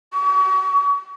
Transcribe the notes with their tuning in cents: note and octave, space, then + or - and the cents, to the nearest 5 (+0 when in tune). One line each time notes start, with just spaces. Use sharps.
C#6 +40